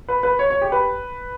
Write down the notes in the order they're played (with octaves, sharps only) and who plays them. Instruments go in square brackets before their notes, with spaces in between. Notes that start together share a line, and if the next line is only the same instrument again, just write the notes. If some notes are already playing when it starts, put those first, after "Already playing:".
[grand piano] B4
B4
C#5
C#5
G4
B4